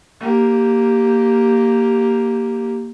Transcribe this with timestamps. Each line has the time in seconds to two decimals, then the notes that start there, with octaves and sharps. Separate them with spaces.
0.20 A#3 G4